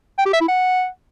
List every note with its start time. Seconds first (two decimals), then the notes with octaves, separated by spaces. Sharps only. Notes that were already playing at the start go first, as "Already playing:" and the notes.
0.18 G5
0.26 G4
0.33 E5
0.41 E4
0.48 F#5